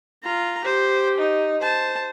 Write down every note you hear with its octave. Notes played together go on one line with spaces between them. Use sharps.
F4 A#5
G4 C5
D#4
C5 A5